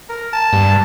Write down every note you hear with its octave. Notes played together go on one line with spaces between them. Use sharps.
A#4
A5
G2